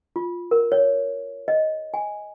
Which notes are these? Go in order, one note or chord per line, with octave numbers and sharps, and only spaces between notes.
F4
A#4
C#5
D#5
G#5